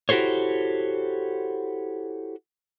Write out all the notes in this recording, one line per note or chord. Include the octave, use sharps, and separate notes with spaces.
E4 F#4 G4 A4 C5 C#5